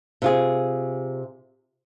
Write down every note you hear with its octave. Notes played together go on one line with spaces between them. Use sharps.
C3 F4 G#4